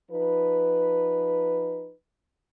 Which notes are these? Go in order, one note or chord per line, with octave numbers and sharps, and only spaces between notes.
F3 D#4 B4